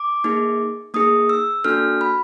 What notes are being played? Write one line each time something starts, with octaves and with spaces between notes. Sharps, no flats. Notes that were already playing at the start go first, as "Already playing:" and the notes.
Already playing: D6
A#3 D#4 G#4
A#3 D#4 G#4 D#6
E6
A#3 D4 F#4 A4 F6
B5